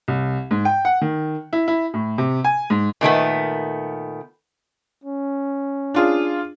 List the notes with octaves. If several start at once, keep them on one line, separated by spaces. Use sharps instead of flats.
C2
G#2
G5
F#5
D#3
E4
E4
A2
C3
G#5
G#2
A#2 D#3 A3 B3
C#4
D4 F4 G#4